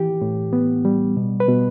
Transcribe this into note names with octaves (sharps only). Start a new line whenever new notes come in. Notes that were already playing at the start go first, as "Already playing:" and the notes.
Already playing: E3 G4
A2
B3
G3
B2
B4
B2